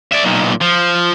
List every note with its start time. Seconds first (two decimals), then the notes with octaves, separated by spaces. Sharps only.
0.12 D5 E5
0.23 B1 A#2
0.61 F3